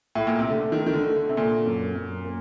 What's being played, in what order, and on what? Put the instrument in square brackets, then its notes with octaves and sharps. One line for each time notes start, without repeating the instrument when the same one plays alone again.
[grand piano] A2
A#2
C3
[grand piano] D3 [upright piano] A3
[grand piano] D#3
[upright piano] A3
[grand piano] D#3
D3
[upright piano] A3
[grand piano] D3
C3
[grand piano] A#2 [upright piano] D3
[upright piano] F#2
F#2
A#3